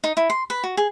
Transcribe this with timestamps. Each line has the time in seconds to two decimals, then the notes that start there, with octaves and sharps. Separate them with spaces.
0.04 D#4
0.17 E4
0.30 C6
0.50 B4
0.64 F#4
0.77 G#4